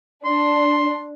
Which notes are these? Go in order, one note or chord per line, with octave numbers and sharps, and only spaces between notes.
D4 C6